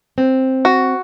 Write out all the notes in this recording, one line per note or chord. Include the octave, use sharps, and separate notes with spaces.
C4
F#4